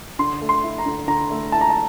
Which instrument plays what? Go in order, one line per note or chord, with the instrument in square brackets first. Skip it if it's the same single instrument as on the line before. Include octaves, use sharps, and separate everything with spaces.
[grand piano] D3 C6
A3
C6
E4
A#5
D3
D3 A#5
A3
E4 A5
A#5
A5